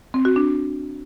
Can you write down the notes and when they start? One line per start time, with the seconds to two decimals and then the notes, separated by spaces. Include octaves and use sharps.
0.14 C4
0.25 F#4
0.36 D4